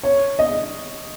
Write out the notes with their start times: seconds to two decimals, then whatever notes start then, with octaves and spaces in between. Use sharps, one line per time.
0.03 C#5
0.39 D#5